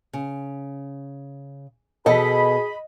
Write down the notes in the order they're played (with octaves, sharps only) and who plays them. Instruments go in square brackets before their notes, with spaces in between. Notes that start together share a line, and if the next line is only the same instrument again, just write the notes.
[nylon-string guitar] C#3
[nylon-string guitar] B2 A4 [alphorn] G#4 [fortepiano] D#5 [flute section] B5